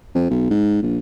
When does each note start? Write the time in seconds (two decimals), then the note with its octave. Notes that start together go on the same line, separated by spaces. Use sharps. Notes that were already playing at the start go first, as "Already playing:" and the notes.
0.15 F2
0.30 B1
0.50 G#2
0.82 A#1